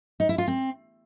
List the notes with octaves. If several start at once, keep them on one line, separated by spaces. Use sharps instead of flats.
D#4
E4
F4
C4